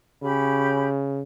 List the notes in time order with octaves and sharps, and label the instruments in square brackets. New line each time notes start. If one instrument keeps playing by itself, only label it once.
[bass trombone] C#3 [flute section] C#4 G4 B5